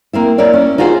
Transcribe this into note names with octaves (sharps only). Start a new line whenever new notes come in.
A#3 C4 E4
A#3 E4 A#4 C#5 D5
C#4
D#4 F4 F#4 G#4 C5